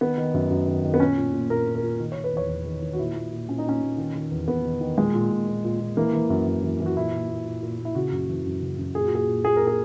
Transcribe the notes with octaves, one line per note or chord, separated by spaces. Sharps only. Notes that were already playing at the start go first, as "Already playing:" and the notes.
D#3 B3
D#3
F#2
F#2
D#3
D#3
B3
A#2 C#4
A#2
A#2
A#2 A#4
A#2
A#4
A#2
D#3
D#3 C#5
B4
E2 C#5
E2
D#3
D#3
F#4
A#2 E4
A#2
A#2
A#2 C#4
D#4
A#2 C#4
A#2
D#3
D#3
E2
E2 B3
D#3
D#3
A#2 G#3
A#2
A#2
A#2
A#2
A#2
E3 A#3
E3
F#2
F#2
E3
E3
F#4
A#2 E4
A#2
A#2
A#2
A#2
A#2
E4
C#3 F#4
F#2
E3
F#2
C#3
F#2
A#2 G#4
F#4
A#2 G#4
A#2
A#2 G#4
A#2 A#4
G#4